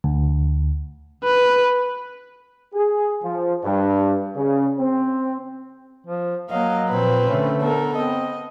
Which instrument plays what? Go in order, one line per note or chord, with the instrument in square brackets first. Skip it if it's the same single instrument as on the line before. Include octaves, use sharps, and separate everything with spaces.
[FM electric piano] D2
[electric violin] B4
[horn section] G#4
F3
G2
C#3
C4
[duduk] F3
[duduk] F#3 [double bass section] A#3 [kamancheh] D#5 F5
[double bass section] A#2 F3 [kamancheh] C4 B4
[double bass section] D3 C#4 [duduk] A3
[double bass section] B3 [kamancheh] A4 A#4
[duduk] C4 [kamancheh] D#5